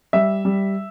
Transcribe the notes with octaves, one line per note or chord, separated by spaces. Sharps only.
G3 E5
G3